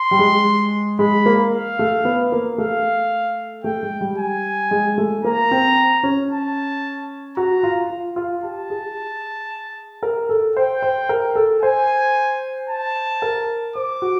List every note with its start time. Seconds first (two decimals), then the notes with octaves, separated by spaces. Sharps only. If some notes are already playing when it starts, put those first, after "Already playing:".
Already playing: C6
0.11 G3
0.19 G#3
0.99 G#3 B5
1.26 A#3
1.52 F5
1.79 A3
2.05 B3
2.32 A#3
2.58 A3 F5
3.64 A3 G5
3.83 G#3
4.01 G3
4.18 G#5
4.71 G#3
4.98 A3
5.24 A#3 A#5
5.51 C4
6.03 C#4
6.31 A5
7.36 F#4 A#5
7.63 F4
7.90 F4
8.16 F4
8.43 G4 A5
8.70 G#4
10.03 A#4
10.29 A4
10.56 C5 G5
10.82 C5
11.09 A#4
11.36 A4
11.62 C5 G#5
12.69 A5
13.22 A#4
13.75 C5 D6
14.02 F#4